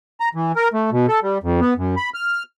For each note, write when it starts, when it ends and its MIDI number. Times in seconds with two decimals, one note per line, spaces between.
0.20 0.29 82
0.35 0.52 52
0.56 0.68 70
0.74 0.90 57
0.92 1.06 47
1.08 1.20 69
1.23 1.38 55
1.43 1.60 41
1.60 1.74 59
1.77 1.95 42
1.97 2.10 83
2.14 2.43 89